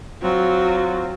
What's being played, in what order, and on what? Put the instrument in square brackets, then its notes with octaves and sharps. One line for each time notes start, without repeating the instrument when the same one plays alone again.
[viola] F#3 [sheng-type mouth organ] C4 F4